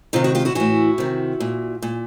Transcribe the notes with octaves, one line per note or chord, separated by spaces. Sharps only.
C3 D#3 D#4 F4
E4 F#4
F4 G4
E4 F#4
A2 E3 E4 F#4
C3 D#3
A#2
A#2